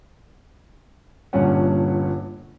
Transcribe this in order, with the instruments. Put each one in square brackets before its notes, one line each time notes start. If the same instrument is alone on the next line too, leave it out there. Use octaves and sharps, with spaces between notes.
[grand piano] G1 G2 A#2 C#4 F#5